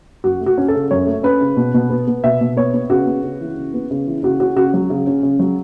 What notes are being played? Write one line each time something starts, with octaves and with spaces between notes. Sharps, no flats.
F#2 F#4
A3
F#4
C#4
A4
C#3
F#2 C#5
A3
C#4 B4
C#3
B2
B2
B3
B3
B2 E5
B2
B3 C#5
B3
C#3 F#4
B3
C#3
E3
C#3
B3
C#3
E3
C#3 F#4
C#4 F#4
C#3 F#4
F#3
C#3
C#4
C#3
F#3